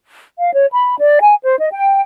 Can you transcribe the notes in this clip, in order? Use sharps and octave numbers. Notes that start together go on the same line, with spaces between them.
F5
C#5
B5
D5
G#5
C5
D#5
G5